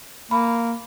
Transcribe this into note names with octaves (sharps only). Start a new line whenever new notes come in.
A#3 B5